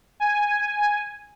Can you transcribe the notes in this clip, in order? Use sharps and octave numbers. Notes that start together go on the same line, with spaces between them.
G#5